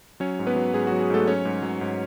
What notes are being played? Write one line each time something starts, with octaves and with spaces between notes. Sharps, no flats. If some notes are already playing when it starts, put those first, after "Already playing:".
F#3 C#4 C#5
G#2
B3 B4
F#3
G#2 G#4
F#4
F#3
G#4
G#2 A3 A4
F#3 C#4 C#5
G#2
F#3
G#2